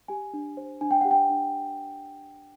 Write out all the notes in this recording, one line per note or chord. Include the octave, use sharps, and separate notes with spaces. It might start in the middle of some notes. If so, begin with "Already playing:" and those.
G4 G#5
D4
C5
D4 G#5
G5
G4 F#5
G5
D4